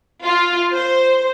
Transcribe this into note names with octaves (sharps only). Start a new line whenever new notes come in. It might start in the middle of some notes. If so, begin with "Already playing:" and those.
F4
C5